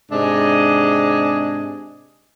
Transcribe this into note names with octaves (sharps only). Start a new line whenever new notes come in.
G#2 C3 D4 G#4 D#5